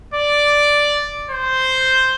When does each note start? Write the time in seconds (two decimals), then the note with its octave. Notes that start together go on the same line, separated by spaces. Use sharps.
0.14 D5
1.30 C5